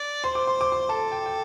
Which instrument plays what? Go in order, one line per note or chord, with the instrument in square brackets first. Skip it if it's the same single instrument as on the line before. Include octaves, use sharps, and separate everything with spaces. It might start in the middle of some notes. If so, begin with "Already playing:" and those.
Already playing: [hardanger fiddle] D5
[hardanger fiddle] C5 [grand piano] C6
[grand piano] D6
C6
D6
C6
[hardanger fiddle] A4 [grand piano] A5
[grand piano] G5
G5